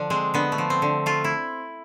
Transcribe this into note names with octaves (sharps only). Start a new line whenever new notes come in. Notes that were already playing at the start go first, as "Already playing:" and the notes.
Already playing: D3 F3 D4
G#3 C4
D3 B3
A3
F3
C4
D3
A3 F4
E4